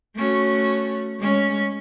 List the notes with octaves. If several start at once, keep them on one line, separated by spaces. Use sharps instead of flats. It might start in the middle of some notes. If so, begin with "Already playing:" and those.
A3 C#4 F#4
G#3 C#4